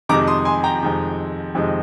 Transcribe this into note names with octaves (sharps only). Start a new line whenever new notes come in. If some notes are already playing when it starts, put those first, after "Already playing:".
F2 C3 D#3 G#3 A#5 D6
C6 D#6
G#5 C6
G5 A#5
F2 C3 D#3 G#3
F2 C3 D#3 G#3